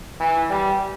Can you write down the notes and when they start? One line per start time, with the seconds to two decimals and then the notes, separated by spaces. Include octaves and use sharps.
0.20 E3
0.50 G3